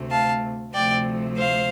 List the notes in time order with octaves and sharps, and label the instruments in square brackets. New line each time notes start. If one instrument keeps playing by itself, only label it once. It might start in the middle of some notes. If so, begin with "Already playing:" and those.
Already playing: [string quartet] D2 C3 A3
F5 A5
D2 C3 F3 A3 D5 G5
C5 F5